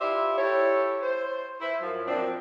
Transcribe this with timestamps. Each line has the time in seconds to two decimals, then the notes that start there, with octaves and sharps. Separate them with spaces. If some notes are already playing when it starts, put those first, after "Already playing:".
0.01 E4 F4 G4 C5 D5 E5
0.38 E4 G4 A4 C#5
1.02 C5
1.60 E4 C5
1.82 F#2 F3 F#3
2.07 A#2 F3 C4 D4